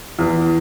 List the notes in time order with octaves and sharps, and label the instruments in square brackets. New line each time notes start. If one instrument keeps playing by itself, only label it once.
[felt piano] E2